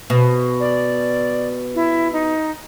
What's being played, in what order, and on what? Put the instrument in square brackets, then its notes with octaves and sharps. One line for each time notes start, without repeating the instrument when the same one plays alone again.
[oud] B2
[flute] D5
E4
D#4